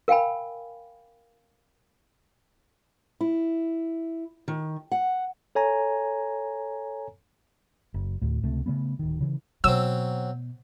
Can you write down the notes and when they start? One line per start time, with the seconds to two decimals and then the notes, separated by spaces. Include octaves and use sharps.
0.08 A#4 F5 G5 G#5 B5
3.21 E4
4.48 D#3
4.92 F#5
5.55 A4 C#5 G#5 A#5
7.94 F#1
8.22 D2 A2
8.43 C#2 C3 A3
8.66 C#3 F#3 A3 B3
8.99 D1 D#3
9.21 C#3 E3
9.64 B2 F#3 C4 E6